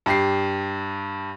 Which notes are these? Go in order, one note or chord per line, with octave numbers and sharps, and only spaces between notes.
G2 G4 C7